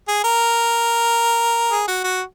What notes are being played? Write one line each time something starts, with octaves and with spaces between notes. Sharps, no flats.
G#4
A#4
G#4
F#4
F#4